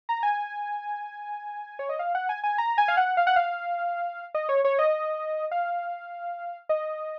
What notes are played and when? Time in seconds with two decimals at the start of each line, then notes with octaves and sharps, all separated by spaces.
0.09 A#5
0.23 G#5
1.79 C#5
1.89 D#5
1.99 F5
2.15 F#5
2.29 G#5
2.44 G#5
2.58 A#5
2.78 G#5
2.88 F5
2.97 F#5
3.17 F5
3.27 F#5
3.36 F5
4.35 D#5
4.49 C#5
4.65 C#5
4.79 D#5
5.51 F5
6.69 D#5